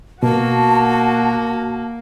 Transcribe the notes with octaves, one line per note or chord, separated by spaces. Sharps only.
B2 A#3 F#4 A5